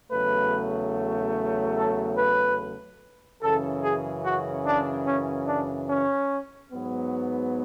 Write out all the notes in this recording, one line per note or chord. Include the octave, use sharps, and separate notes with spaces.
E2 C#3 F#3 A3 B4
A4
B4
F#2 C#3 E3 A4
G#4
F#4
D4
C#4
D4
C#4
G#2 F#3 B3